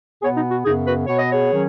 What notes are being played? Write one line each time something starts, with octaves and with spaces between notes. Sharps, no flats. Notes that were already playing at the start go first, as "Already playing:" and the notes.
B2 B3 G#4 C#5
D#4
F#4
F#2 C#3 B3 D#4 G#4
F#4 B4
B2 B3 C#5
D#5
G#4 C#5
D#3 F#3 C#4